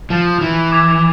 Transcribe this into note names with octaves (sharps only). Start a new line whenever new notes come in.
F3 A6 E7
E3
D6 G#6 B6 F7